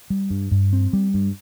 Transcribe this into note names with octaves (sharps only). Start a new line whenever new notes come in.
G3
G2
G2
C4
G3
G2